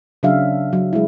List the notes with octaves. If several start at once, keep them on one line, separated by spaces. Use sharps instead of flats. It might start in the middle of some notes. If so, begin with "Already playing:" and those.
C#3 F#3 D4 E5 F5
F#3
G#3 E4